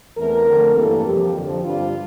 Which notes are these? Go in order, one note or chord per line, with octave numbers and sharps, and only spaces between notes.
E2 E3 A3 C4 A#4
F2 D3 A3 C4
G2 E3 A#3 A4
F2 C3 F3 G4
F2 D3 F3
G2 D3 G3 D4 F4